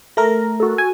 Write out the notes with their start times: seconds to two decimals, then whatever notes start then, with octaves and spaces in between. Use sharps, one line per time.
0.17 A3 A#4 A#6
0.60 F#4 A4
0.78 G#5